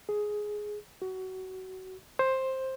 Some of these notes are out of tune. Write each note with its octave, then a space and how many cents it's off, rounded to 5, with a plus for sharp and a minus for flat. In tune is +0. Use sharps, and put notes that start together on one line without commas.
G#4 +10
F#4 +20
C5 +10